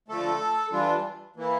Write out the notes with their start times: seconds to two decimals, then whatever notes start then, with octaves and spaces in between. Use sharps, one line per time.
0.08 D3 F3 A3 A4
0.72 E3 G3 D4 F4
1.36 E3 A#3 E4